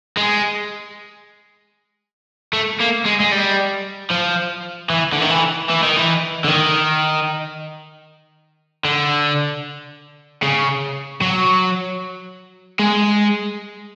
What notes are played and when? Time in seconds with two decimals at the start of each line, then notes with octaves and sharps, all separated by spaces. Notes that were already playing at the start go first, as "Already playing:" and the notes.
0.17 G#3
2.53 A3
2.80 A#3
3.05 G#3
3.20 G#3
3.32 G3
4.11 F3
4.90 E3
5.12 D3
5.22 D#3
5.30 E3
5.69 E3
5.83 D#3
5.96 E3
6.44 D3
6.48 D#3
8.85 D3
10.42 C#3
11.21 F#3
12.80 G#3